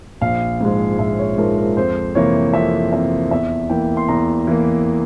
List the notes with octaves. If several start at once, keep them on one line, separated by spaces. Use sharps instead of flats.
A#1 F5
G#2 F3 G#3
A#1 E5
C#5
G#2 F3 G#3 A#4
A#4
F2 C5
C3 E3 A#3 C#5
F2 E5
C3 E3 A#3 E5
E2 E5
E3 A#3 G5
C6
E2 A#5
E3 A#3